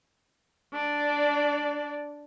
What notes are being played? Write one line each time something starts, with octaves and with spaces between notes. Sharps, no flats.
D4 D5